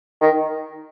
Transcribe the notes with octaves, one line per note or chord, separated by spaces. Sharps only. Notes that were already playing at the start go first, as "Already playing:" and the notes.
D#3